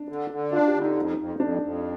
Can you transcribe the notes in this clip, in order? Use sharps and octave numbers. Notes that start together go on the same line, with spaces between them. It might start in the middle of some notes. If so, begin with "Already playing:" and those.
Already playing: D4
D3
D3
D4 F4
G4
D3
D#4
F2
F2
F2 D4
F2